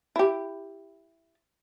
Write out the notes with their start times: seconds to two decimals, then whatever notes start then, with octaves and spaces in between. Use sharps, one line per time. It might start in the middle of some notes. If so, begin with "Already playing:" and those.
0.16 E4 G4